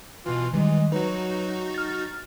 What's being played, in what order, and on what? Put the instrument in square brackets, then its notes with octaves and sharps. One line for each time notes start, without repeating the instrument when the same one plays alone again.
[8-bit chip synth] B2 E3 [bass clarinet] F4
[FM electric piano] D#3 G3 [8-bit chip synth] E3 [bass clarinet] G#3
[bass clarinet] F#3 [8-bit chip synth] D#4 F#4 [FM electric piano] B4
[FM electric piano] F6 A6